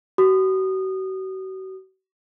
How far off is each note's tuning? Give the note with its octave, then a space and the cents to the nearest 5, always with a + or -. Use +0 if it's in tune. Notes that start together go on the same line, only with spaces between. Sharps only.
F#4 +40 D#6 -25